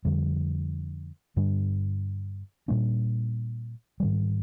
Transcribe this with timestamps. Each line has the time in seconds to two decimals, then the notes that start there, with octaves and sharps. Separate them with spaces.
0.05 F2 D3 G3
1.36 G2 D3 G3 D4
2.68 A#2 G3 A#3 D4
4.00 G#2 D#3 G3